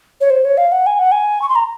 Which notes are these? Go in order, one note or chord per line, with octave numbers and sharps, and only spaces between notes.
C#5
C5
C#5
F5
F#5
G#5
F#5
G#5
C#6
C6
A#5